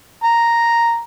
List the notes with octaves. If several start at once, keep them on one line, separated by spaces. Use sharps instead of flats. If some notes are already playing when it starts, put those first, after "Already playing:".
A#5